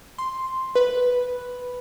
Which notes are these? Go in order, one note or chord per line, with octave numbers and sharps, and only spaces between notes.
C6
B4